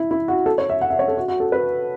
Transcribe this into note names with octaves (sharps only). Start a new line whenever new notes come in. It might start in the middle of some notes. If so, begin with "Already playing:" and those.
Already playing: E4
E4
F#4
A4
C#5
E5
F#5
E5
C#5
A4
F#4
F#4
A4
B4